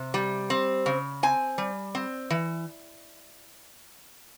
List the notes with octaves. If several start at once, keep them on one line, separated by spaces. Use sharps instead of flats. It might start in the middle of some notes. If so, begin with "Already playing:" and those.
Already playing: C3
G3
C4
C#3
C4 G#5
G3
C4
E3